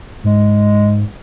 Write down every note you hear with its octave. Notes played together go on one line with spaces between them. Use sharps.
G#2 G#3